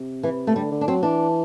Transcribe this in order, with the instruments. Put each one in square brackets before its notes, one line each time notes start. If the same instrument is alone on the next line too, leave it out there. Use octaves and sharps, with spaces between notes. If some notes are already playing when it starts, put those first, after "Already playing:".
Already playing: [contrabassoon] C3
[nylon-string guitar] E3
A3
[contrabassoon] D3 [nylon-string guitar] G3
[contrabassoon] D3
[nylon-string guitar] D4
[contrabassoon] F#3 [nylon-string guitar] C4
[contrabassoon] E3 [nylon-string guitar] D4